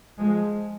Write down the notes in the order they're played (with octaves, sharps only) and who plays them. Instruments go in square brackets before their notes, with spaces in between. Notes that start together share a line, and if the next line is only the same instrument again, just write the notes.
[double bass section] F3 G#3